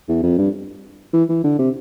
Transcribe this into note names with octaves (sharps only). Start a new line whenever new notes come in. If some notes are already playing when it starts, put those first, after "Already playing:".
E2
F2
G2
E3
E3
D3
C3